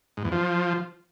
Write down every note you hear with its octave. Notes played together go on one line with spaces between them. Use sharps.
G#2
E2
F3